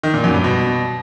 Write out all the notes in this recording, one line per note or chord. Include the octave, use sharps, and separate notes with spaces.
D#3
A#2
F#2
G2
B2